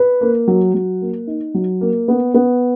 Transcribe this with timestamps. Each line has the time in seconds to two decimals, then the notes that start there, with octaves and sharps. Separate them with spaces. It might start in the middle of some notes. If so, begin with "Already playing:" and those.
Already playing: B4
0.21 A#3
0.48 F#3
0.74 F#3
1.01 A#3
1.27 D#4
1.54 F#3
1.81 A#3
2.08 B3
2.34 B3